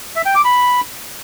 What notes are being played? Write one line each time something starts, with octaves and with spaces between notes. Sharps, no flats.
E5
G5
D6
B5